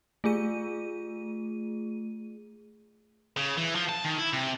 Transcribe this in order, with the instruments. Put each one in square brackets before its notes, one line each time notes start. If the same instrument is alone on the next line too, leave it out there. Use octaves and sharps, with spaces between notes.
[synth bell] A3 F4 G#4 D#7
[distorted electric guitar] C#3
E3
F3
A5
D#3
E4
C3